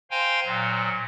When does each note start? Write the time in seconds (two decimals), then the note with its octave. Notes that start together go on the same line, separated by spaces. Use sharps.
0.11 C5 F5 G5 G#5 A#5 C6
0.45 A#2 F#3